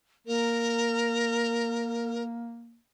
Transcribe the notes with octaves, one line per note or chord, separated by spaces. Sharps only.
A#3 A#4